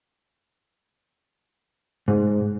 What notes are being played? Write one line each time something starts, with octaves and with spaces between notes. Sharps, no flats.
G#2